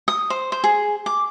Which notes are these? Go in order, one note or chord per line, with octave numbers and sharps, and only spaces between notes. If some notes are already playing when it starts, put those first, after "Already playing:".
D#6
C5
C5
G#4
D6